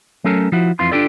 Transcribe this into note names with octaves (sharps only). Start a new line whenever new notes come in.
F#3 A3 C#4 A4 A#4
F3 E4 F#4
F2 E3 F4 C6
D4 D#4 F4 G4 A4 D5